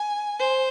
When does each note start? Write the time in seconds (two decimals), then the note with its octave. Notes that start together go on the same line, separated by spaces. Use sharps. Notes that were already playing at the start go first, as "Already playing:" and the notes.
Already playing: G#5
0.39 C5